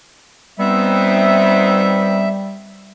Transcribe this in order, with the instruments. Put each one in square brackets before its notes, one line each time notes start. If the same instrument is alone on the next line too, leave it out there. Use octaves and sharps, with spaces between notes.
[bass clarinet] G3 [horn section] B3 C4 D#4 [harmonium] E5